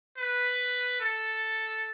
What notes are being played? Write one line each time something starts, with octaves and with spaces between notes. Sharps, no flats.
B4
A4